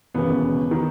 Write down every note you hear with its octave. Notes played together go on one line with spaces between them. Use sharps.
E1 D#2 C#3 B3
D#3